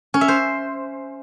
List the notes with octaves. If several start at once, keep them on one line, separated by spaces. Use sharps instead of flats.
C#4
E5
C5